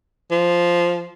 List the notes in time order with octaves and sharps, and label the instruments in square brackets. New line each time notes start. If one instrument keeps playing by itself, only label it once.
[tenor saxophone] F3